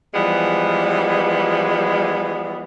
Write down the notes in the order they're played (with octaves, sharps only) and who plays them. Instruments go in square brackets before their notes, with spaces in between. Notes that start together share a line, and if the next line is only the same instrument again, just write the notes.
[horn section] E3 F3 G3 G#3 B3